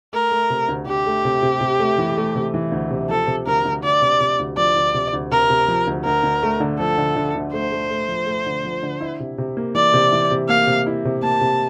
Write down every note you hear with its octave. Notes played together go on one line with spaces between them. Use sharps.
A3 A#4
A3
C3
D2
D2 G4
A3
C3
C3
C3
A3
E3
A3
C3
E3
D2
C3
F3 A4
C3
D2 A#4
D2
D2 D5
C3
C3
D2
F3 D5
D2
C3
D2
C3 A#4
C3
F3
D2
D2 A#4
D2
A3
D3
F3 A4
D3
D3
D2
A3 C5
A3
A3
F3
A3
D3
F3
D3
E4
C3
C3
A#3
E3 D5
C3
E3
C3
A#3 F5
C3
E4
C3
A#3 A5
C3